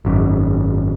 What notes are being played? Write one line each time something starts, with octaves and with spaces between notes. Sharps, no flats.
G#1 F#2